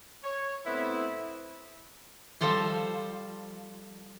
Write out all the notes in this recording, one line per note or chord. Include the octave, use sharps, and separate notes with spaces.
C#5
A2 B3 C4 E4
F3 G3 A4 C5 F5